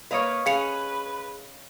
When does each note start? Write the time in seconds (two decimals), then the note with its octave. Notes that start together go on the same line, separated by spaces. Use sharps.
0.11 A#3 B4 C#5 D#5 F5
0.46 C#4 G#4 B4 F5 C#7 F7